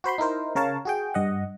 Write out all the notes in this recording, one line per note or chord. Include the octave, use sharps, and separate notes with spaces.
F#4 C5 B5 C6
D#4 E4 A#4 C5
C#3 A#4 C#5 F5 A5
F#4 G#4 G5
G2 D#5 F#5